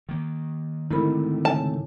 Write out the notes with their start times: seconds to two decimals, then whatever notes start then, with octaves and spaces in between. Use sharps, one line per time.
0.09 D#3 A#3
0.91 G#2 D3 D#3 A3 C4 E4 A#4 B5
1.45 C#3 G#5 A5